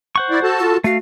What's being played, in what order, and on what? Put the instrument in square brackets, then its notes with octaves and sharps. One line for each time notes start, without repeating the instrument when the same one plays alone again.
[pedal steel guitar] C5 F#5 C#6
[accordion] E4 D5
F#4 A4 A5
[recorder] F4
[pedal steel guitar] A3 F5 [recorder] F#4